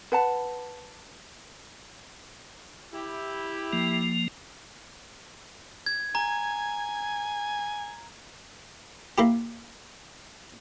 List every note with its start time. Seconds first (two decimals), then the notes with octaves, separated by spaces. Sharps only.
0.12 B4 F#5 A5
2.93 E4 G4
3.73 F3 A#3
5.86 G#6
6.15 G#5 A#5
9.18 A#3 E4 G4